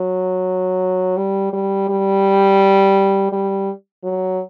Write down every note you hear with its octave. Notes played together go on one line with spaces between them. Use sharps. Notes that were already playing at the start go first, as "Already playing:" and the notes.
Already playing: F#3
G3
G3
G3
G3
F#3